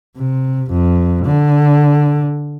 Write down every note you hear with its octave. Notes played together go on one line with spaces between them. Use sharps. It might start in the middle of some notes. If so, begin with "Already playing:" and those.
C3
F2
D3